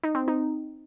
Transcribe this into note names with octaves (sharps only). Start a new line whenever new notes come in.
D#4
C4
D#4